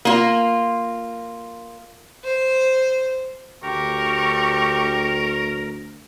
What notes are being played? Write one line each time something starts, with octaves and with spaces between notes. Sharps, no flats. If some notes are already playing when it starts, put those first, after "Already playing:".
A#3 F4
C5
D2 G4 A#4 C#6